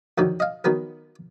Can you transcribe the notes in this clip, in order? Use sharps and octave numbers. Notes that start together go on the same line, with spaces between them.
F2 D3 D#3 F#3
D#5 F5
D#3 F#3 B3 A#4